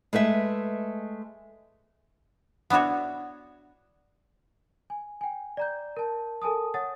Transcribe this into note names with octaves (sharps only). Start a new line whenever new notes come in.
G#3 A3 B4 E5
B3 D4 E4 F#4 C#5
G#5
G5 G#5
D5 A#5 G6
A#4 A5
A4 A#4 G#5 A5 D#6
C#5 F#5 D#6 A6